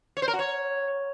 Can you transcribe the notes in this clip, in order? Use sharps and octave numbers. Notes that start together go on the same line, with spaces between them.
C#5
C5
A#4
F#4
C#5